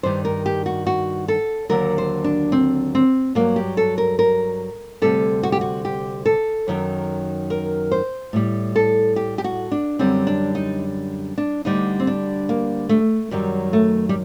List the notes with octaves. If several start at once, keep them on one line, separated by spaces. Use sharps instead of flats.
G2 D#3 G3 C5
A#4
G4
F#4
F#4
A4
D#2 D3 F#3 A#4
C5
D4
C4
C4
G2 F#3 A#3
G4
A4
A#4
A#4
D2 C3 G3 A4
F#4
G4
F#4
G4
A4
F#2 D#3 F#3
A#4
C5
A2 G3
A4
G4
G4
F#4
D4
F#2 D3 G3 C4
D4
D#4
D4
D2 D3 G3 D#4
C4
D4
A#3
A3
F#2 D#3 F#3 G3
A3
G3